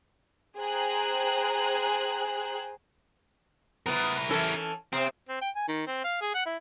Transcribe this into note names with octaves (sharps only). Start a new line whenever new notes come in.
G#4 C5 G5 G#5 A#5 F#6
B3 E4 A#4 B4
E3 C#4 A4
C3 C4
C4
G5
G#5
D#3
C4
F5
G#4
F#5
E4